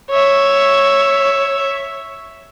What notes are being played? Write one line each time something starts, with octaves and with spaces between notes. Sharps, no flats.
C#5 E5